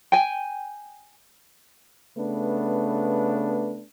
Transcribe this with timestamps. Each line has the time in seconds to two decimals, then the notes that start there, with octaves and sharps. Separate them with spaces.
0.12 G5 G#5
2.18 C#3 A3 B3 D4 B4